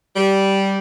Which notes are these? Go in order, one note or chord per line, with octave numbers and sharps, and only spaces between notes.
G3